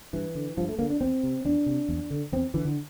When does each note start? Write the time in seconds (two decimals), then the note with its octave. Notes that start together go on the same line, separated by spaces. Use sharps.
0.13 G2 E3
0.35 D3
0.57 G2 F3
0.69 A3
0.79 D3 A#3
0.90 D4
1.01 E2 C4
1.23 C3
1.45 E2 D4
1.66 C3
1.89 E2
2.10 D3
2.32 E2 C4
2.54 D3 E3
2.65 D3